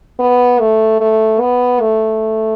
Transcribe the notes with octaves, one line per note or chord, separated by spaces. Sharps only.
B3
A3
A3
B3
A3